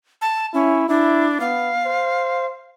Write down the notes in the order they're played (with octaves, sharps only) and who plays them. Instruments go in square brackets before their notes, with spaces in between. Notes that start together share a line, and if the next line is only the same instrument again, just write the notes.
[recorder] A5
[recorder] C#4 [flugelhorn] E4
[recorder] D4 [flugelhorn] E4
[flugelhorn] B3 [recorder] F5
[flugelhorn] C5